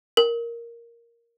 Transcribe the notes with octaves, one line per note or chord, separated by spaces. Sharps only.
A#4